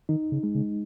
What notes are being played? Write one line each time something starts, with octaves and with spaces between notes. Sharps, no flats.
D#3 D#4
C#3
G#3
C#3